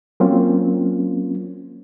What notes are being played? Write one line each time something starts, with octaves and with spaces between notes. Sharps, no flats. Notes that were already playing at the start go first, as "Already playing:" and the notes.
F#3 A#3 C4 C#4 F4